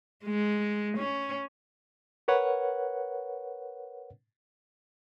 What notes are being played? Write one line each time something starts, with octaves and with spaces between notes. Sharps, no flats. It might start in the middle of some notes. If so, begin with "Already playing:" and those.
G#3
C#4
A#4 B4 C#5 F#5